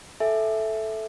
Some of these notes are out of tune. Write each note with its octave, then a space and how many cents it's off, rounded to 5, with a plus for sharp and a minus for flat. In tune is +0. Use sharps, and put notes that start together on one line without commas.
A4 -10 E5 +0 G#5 +0